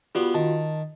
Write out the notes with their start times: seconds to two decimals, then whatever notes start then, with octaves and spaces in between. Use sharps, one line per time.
0.15 G3 B3 F4 F#4
0.34 D#3 A5